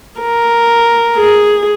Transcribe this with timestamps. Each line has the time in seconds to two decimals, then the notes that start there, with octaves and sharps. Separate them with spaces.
0.21 A#4
1.18 G#4